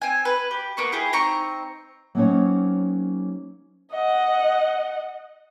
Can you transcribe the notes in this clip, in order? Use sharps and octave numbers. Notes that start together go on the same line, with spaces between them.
C4 G#5
B4
G4
A#3 B3 C#6
E4 G4 G#4
C4 D#4 A#5 C#6
F#3 A#3 C4 C#4 D#4 C#5
D#5 F#5